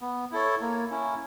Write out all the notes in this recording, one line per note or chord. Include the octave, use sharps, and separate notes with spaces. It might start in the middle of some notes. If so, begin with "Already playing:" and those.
B3
E4 A4 C#5
A#3
C#4 E4